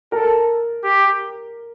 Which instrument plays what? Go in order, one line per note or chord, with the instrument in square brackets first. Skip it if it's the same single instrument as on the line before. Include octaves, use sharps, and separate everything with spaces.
[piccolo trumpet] A4 [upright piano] A#4
[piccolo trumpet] G4